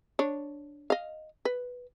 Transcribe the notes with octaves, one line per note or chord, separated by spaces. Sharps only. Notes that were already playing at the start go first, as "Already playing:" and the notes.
D4 C#5
D#5 F5
B4